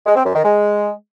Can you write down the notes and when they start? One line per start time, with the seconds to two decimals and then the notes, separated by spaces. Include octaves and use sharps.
0.06 G#3
0.16 C4
0.25 F#2
0.35 D#3
0.44 G#3